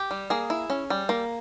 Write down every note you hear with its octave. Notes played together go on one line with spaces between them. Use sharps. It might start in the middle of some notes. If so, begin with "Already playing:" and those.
Already playing: G4
G3
A#3 G#4
E4
C#4
G3
A#3